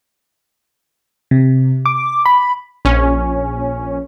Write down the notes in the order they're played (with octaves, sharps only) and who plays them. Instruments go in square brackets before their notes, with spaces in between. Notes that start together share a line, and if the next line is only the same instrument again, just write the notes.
[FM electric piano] C3
D6
B5
[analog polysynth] A#1 C#4